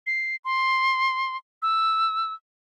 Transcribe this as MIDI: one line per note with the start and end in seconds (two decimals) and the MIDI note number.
0.07 0.36 96
0.45 1.37 84
1.62 2.34 88